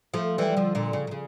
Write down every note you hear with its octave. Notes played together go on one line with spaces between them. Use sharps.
F3 A3
E3 G3
D3 F3
A#2 D3
C#3
A#2
C#3